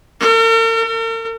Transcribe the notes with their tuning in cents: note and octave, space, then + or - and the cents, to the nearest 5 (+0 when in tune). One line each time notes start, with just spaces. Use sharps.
A#4 -45
A#4 -45